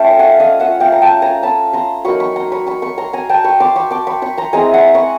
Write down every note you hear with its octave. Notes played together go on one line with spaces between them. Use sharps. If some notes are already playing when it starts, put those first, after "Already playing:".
Already playing: A3 C#4 F4 G5 A5
F#5 G#5
D#5 F5
E5 F#5
F5 G5
A#5
G5 A5
G#5 A#5
A5 B5
A#5 C6
F#3 A#3 D#4 B5 C#6
B5 C#6
A#5 C6
B5 C#6
B5 C#6
B5 C#6
A#5 C6
G#5 A#5
G5 A5
B5 C#6
C6 D6
B5 C#6
C6 D6
B5 C#6
B5 C#6
A#5 C6
G#3 C4 E4 G#5 A#5
F#5 G#5
B5 C#6